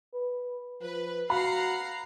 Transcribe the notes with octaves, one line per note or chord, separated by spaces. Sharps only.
B4
F3 B4
F#4 F5 F#5 A#5 B5 C7